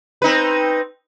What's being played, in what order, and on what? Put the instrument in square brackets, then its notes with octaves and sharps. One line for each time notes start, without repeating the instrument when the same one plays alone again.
[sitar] C4 D#4 B4